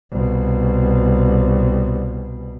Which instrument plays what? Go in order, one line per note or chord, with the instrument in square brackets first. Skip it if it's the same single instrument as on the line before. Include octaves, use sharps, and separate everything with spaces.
[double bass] C2 B2